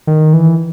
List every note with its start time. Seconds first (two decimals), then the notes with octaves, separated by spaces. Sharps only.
0.07 D#3
0.33 E3